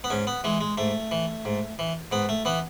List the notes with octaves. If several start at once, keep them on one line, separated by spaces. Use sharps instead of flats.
B3
G#2 C#4
B3
E3 G#3
G#3
G#2 A3
E3
G#2
E3
G#2 B3
A3
E3 B3